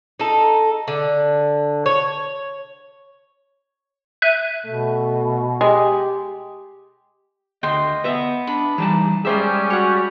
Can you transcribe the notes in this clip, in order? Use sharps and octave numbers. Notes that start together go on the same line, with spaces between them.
D#4 A4
D3
C#5
E5 F#6 D#7
B2 A3
G#3 G4
D2 D#5 G5 C6
B3 E5
D4 B5
E3 G3 D#4 A5
G3 G#3 C#4 G4 G#4 C5 E5
F#4 C#5 F#5